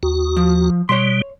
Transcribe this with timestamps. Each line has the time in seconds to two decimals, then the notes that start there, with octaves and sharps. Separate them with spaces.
0.03 D#2 F#4
0.36 F3
0.89 B2 G3 C#5 C6